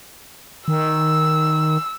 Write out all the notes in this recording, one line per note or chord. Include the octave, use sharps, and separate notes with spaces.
D#3 E6